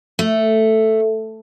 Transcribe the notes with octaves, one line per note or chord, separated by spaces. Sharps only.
A3